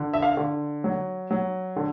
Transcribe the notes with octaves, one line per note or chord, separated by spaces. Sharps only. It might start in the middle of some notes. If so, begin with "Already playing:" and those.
Already playing: D3
E5
F5
D3
F#3
F#3
D3